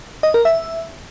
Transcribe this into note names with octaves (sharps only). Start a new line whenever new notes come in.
D#5
A#4
E5